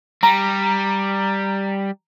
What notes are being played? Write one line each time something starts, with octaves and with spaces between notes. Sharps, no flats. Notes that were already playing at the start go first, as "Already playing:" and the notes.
G3 A#5